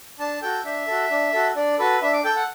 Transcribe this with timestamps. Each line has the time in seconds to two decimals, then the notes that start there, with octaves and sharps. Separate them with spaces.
0.19 D4 A5
0.42 F#4 A4 G5
0.65 D4 E5
0.87 F#4 A4
1.10 D4
1.33 F#4 A4
1.56 D4 D5
1.79 F#4 A4 B4
2.02 D4 E5
2.13 D6
2.24 A4 G5
2.36 F#5